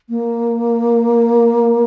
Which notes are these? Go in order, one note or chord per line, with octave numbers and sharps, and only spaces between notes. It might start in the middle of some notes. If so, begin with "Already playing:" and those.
A#3